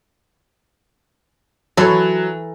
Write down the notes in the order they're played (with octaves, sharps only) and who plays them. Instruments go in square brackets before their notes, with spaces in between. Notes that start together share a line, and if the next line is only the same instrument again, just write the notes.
[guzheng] E3 A4 C#5 [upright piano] F#3